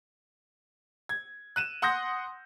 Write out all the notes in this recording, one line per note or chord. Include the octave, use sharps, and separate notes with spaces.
G#6
F#6 D#7 E7
F#5 C6 D#6 G6 A#6